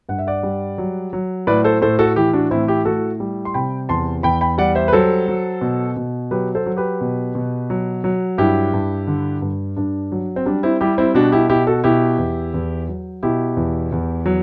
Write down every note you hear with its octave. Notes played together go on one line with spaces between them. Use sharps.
G2 F#5
E5
D5 F#5
G3
F#3
F#3
A2 B4 D5
A4 C5
A2 A4 C5
F#4 A4
E3 E4 G4
D4 F#4
A2 C4 E4
E4 G4
A2 F#4 A4
G3
C6
C3 G5 B5
E2 A5 C6
E2 G5 B5
G5 B5
G3 D5 F#5
C5 E5
B4
F#3 A4 C5
F#3
B2
B2
F#3 G4 B4
A4 C5
F#3
G4 B4
B2
B2
F#3
F#3
G2 E4 G4
G2
D3
G2
G2 D4
F#3
C4
G3 D4
C4 E4
G3 E4 G4
C4 E4
B2 D4 F#4
E4 G4
B2 E4 G4
F#4 A4
B2 E4 G4
E2
E2
F#3
B2 E4 G4
E2
E2
F#3